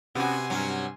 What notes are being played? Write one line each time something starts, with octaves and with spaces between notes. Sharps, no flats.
C3 B3 C#4 F#4 G#5 C6
G2 F#3 C#4